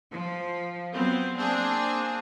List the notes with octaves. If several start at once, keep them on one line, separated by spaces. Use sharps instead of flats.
F3
F#3 B3 C4
A#3 C4 D4 G#4